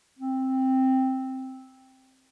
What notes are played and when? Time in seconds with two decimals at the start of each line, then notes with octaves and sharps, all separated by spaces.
0.19 C4